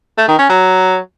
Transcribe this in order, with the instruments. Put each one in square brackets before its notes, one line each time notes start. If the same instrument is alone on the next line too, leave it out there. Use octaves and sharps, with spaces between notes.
[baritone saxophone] A3
D#3
C#4
F#3